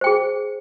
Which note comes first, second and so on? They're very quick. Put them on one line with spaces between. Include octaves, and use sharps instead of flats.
C5 G5 G#4